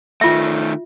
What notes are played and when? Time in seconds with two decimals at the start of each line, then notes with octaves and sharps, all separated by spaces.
0.21 D#3 A3 F4 E5